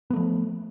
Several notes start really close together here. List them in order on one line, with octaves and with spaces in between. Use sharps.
B3 A3 F3